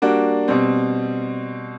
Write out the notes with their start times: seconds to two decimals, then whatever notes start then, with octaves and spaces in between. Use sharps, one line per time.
0.02 G3 A#3 D4 F#4
0.48 B2 G3 C4